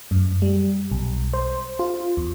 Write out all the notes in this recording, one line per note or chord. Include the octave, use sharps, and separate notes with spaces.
F#2
G3
B1
C5
F4
E2